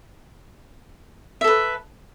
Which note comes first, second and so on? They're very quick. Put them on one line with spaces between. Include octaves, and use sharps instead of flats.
E5 A4 B4